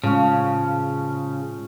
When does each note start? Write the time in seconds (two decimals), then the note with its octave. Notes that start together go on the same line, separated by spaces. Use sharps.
0.04 A2 C#3 F3 G#3 C#4